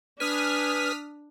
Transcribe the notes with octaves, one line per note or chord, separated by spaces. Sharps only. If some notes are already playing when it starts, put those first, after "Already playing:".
D4 B4 G#5 D#6 F6 B6